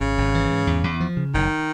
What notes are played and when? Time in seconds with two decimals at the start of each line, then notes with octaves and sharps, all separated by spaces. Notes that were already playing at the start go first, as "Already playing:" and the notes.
0.01 G#1 C#3
0.18 G#1
0.34 E3
0.50 G#2
0.67 E2
0.84 E2
1.00 F3
1.17 C#3
1.34 F#1 D#3